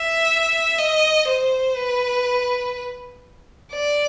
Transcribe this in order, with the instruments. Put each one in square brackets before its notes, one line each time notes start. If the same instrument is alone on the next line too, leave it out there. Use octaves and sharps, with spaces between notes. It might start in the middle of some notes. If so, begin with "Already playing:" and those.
Already playing: [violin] E5
D#5
C5
B4
D5